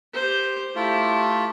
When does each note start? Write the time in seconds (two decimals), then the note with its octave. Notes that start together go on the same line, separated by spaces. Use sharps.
0.14 G4 C5
0.76 A3 E4 F4 G4